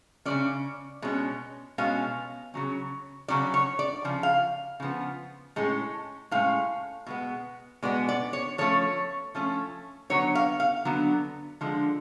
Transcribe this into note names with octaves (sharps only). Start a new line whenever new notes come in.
C#3 G#3 C#4 D5
B2 G#3 C#4
B2 G#3 C#4 F5
C#3 F#3 C#4
C#3 F#3 C#4 D5
C#5
D5
C#3 F3
F5
C#3 F3 B3
A2 G#3 C#4
A2 G#3 C#4 F5
B2 G#3 B3
B2 G#3 B3 D5
D5
C#5
F3 A3 C#4 C#5
F3 A3 C#4
D3 F#3 B3 C#5
F5
F5
D3 F#3 B3
D3 F3 G#3